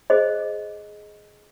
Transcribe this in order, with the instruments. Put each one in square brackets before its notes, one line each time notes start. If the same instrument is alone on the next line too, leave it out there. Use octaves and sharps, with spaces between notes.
[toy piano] G#4 C5 D#5